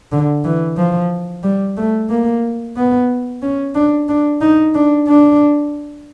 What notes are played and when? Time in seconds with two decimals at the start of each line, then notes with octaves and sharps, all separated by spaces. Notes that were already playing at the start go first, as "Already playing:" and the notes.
0.12 D3
0.44 E3
0.77 F3
1.43 G3
1.77 A3
2.10 A#3
2.76 B3
3.43 C#4
3.75 D4
4.09 D4
4.41 D#4
4.74 D4
5.08 D4